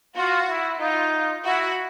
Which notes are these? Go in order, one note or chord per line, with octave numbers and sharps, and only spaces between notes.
F4 F#4
E4
D#4 F4
E4 F#4